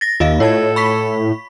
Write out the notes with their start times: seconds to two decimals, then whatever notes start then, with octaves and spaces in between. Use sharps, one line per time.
0.01 A6 A#6
0.20 D#2 F4 D#5 F5
0.40 A2 A4 C#5 A5 G#6
0.76 B5 C#6 B6